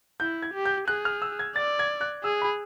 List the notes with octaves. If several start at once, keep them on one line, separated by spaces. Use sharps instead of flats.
E4 G6
G#6
G4
G6
G#4 F#6
F6
E6
G#6
D5 A6
G#6
F#6
G#4 E6
B5